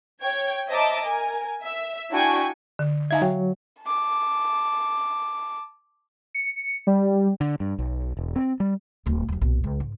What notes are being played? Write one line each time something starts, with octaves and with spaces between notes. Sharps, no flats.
C#5 G5 G#6
C5 D#5 E5 A5 A#5 D6
A#4 G#5
E5
D4 E4 F#4 G5 G#5 C#6
D3
D#4 E5 F5 G#5 G#6
F#3 F5 G5
A5 D6
C#7
G3
D3
G2
B1
E1
C4
G3
D1 A2
D#1 F#3
B1 A#2
C#2
G#2